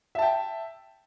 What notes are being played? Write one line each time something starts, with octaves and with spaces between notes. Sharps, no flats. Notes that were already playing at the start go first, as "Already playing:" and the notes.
E5 G5 A5